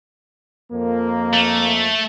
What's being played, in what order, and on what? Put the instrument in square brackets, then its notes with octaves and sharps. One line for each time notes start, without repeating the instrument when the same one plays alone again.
[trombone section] F2 A#3
[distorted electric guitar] A3